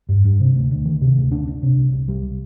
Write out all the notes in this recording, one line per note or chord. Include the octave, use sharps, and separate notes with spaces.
G2
G2
C3
D2
D2
D#3
C3
D2
D4
D4
C3
C2
C2
G3